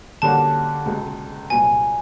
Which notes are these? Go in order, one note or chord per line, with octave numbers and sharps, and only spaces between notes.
D3 G3 A#3 C#4 F#4 A5
C#2 B2 G#3
C2 A#2 F#3 B3 G#5